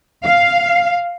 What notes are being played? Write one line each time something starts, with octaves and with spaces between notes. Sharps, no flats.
F5